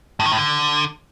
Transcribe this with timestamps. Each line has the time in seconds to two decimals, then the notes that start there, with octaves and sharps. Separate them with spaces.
0.20 A2
0.26 D#3
0.32 A2
0.38 D3